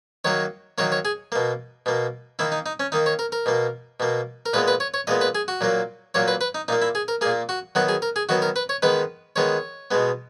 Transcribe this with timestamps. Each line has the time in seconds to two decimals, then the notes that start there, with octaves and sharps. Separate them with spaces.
0.25 D#3 F#3 A#3 C#5
0.78 D#3 F#3 A#3 C#5
0.92 C#5
1.05 G#4
1.32 B2 A#3
1.86 B2 A#3
2.39 D#3 A#3 E4
2.52 D#4
2.66 D#4
2.80 C#4
2.92 D#3 A#3 D#4
3.06 C#5
3.19 A#4
3.32 A#4
3.46 B2 A#3
4.00 B2 A#3
4.46 A#4
4.53 A#2 G#3 B3 B4
4.68 B4
4.80 C#5
4.94 C#5
5.07 A#2 G#3 B3 D#5
5.21 B4
5.35 G#4
5.48 F#4
5.61 A#2 F#3 A#3
6.14 A#2 F#3 A#3 C#5
6.28 B4
6.41 B4
6.55 D#4
6.68 A#2 A#3 D#4
6.82 E4
6.95 G#4
7.08 A#4
7.21 A#3 G#4
7.26 A#2
7.49 F#4
7.75 D#3 F#3 B3 F#4
7.89 G#4
8.02 A#4
8.16 G#4
8.29 D#3 F#3 B3 F#4
8.42 A#4
8.56 B4
8.69 C#5
8.82 D#3 G#3 B3 B4
9.36 D#3 G#3 B3 C#5
9.91 B2 G#3 B3